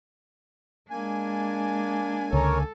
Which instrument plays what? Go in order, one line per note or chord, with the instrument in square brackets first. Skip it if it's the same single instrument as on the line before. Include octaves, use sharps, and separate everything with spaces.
[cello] G#3 D4 [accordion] A#3 G#5
[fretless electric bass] C#2 D3 [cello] A4 [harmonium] A#4 C#5